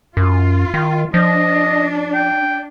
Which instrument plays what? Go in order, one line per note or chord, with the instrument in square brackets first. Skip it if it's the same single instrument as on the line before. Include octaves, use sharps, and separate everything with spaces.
[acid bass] F#2 [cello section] F4
[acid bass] D#3
[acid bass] F3 [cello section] D4 [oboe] D#5
[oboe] G5